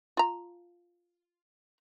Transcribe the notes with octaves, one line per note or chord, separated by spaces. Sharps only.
F4 A#5